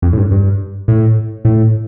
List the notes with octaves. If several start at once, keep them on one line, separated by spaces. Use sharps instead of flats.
F2
A2
G2
G2
A2
A2